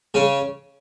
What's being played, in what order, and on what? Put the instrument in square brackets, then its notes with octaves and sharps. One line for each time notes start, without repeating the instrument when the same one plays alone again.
[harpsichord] C#3 C#4